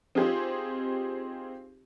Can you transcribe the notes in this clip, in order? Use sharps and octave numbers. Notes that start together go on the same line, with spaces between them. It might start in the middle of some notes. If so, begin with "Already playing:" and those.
C4 D#4 F4 G4 G#4 C5